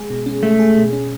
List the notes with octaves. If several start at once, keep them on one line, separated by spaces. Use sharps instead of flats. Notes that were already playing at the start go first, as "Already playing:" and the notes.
Already playing: G#3 G#4
B2
C#4
G#3 A3
G#4
B2
C#4